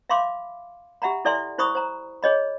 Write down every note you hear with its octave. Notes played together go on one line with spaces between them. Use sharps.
E5 F5 B5 C6 D6
G4 E5 F#5 A#5 B5
E4 A4 D5 E5 G#5 C6
E4 C5 B5 C#6 D#6
C5 A#5
G#4 C#5 D#5 B5